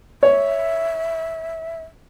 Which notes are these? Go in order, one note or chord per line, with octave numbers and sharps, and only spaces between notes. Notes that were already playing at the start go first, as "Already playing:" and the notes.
C#5 E5